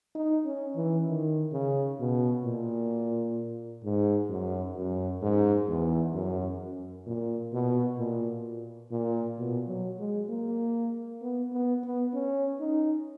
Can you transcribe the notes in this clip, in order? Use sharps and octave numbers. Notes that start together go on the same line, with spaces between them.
D#4
C#4
E3
D#3
C#3
B2
A#2
G#2
F#2
F#2
G#2
E2
F#2
A#2
B2
A#2
A#2
B2
F#3
G#3
A#3
B3
B3
B3
C#4
D#4